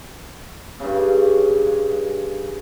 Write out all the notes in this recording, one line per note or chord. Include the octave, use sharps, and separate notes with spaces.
G2 C#3